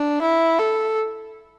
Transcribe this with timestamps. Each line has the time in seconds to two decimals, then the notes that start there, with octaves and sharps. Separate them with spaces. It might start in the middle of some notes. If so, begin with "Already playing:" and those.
Already playing: D4
0.22 E4
0.59 A4